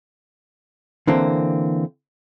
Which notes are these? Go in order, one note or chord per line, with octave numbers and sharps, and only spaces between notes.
D3 E3 A#3 C4